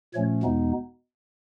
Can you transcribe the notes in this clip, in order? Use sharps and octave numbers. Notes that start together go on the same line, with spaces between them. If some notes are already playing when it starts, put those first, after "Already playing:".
A#2 F3 A3 C#4 C#5
E2 B2 G#3 B3 D#4